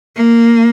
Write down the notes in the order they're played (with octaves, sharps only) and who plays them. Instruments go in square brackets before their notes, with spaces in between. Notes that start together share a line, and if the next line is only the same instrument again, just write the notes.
[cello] A#3